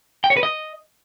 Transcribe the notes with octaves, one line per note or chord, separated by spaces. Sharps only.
G5
C#5
B4
D#5